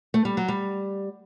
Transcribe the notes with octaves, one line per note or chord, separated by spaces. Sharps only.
A3
G3
F#3
G3